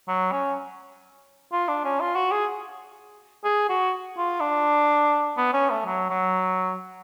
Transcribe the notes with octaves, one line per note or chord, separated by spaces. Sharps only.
F#3
C#4
F4
D4
C#4
F4
F#4
G#4
G#4
F#4
F4
D4
B3
C#4
A3
F#3
F#3